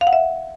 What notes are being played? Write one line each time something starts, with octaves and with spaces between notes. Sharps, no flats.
F5
F#5
E5